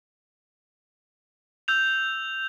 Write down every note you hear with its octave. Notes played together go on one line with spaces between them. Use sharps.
E6 G6 F7